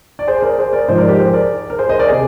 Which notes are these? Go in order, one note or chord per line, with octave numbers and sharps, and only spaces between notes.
D5
G#4 C5
A#4 D5
G#4 C5
A#4 D5
G#2 F3 C5 D#5
A#4 D5
G4 A#4
G#4 C5
A#4 D5
A#4
G#4 C5
C5 D#5
A#4 D5
C3 G#4